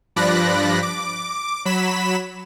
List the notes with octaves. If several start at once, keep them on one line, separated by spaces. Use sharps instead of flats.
G2 F3 D5 B5 F#6 A#6
D6
F#3 B5 B6 E7